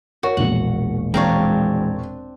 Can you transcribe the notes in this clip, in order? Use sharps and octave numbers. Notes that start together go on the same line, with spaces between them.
F#4 A#4 C#5
E1 A#1 F#5
E3 G#3 C4 D4 C#5 F5 A#5